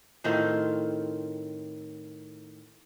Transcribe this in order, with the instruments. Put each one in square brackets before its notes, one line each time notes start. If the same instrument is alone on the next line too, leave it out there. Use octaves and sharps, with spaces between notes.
[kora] A2 D#3 C4 F4